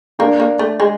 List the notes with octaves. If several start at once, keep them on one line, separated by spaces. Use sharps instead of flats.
A#3 D4
A#3
A3
G#3